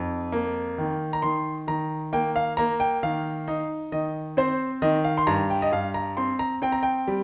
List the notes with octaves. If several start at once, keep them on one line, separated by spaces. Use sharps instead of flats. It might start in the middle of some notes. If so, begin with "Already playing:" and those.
Already playing: F2 D#4
A#3
D#3
A#5
D#3 C6
D#3 A#5
A#3 G5
F5
A#3 A#5
G5
D#3 F5
D#4
D#3 D#5
C4 C5
D#3 D#5
F5
C6
G2 A#5
G5
D#5
G2 F5
A#5
C4 C6
A#5
C4 G5
A#5
G5
G3